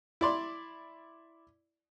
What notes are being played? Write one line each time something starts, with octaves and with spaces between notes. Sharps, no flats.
E4 D5 C6